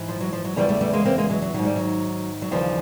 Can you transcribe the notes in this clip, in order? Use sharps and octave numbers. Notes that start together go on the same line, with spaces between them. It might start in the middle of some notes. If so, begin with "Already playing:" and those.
Already playing: G#2 E3
F3
F#3
F3
F#3
E2 C#3 E3 F3 G3
G3 A3
G3 A3
G#3 A#3
A#3 C4
G#3 A#3
F#3 G#3
F#3
G#2 D#3 F#3
G3
F#3
F#3
D#2 C#3 E3 F3 G3